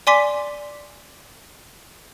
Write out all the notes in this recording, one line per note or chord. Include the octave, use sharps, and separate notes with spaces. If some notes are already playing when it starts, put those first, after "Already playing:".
D5 G#5 C6 D6 B6